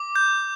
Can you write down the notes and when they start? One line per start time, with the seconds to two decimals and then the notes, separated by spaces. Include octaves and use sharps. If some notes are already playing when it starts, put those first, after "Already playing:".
Already playing: D6
0.16 G6